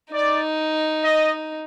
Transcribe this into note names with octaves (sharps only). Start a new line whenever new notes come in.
D#4 D5
D#5